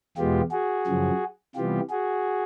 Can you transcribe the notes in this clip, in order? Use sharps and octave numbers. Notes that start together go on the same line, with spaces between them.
E2 B2 G#3 B3 F4 G4
F#4 G#4
F#2 C#3 F3
C3 E3 G3 B3 F4 G4
F#4 G#4